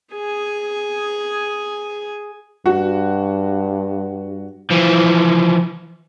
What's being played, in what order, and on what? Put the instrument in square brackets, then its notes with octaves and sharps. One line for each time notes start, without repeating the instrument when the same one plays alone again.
[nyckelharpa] G#4 G#5
[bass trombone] G2 [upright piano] F#4
[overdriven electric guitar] E3 F3